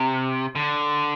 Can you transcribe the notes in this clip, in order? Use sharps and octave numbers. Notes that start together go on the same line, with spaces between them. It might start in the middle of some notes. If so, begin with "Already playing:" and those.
Already playing: C3
D3